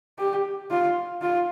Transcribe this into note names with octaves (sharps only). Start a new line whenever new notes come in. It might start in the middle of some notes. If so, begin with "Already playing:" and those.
G4
F4
F4